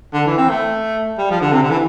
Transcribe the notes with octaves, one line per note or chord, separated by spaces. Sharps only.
D3
E3
C4
A3
G3
F3
D3
C3
D3
E3